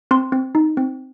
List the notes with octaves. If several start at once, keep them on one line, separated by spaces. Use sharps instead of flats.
C4 C6
C4
D#4
C4